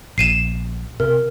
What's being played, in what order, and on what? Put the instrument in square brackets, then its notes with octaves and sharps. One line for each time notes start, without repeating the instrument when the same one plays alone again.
[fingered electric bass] A#1 [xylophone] C7 D#7 E7
[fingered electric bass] C3 [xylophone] A#4